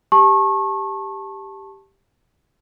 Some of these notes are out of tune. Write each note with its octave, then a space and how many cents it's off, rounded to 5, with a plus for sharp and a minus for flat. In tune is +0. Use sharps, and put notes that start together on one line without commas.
G4 +0 A5 +0 C#6 -30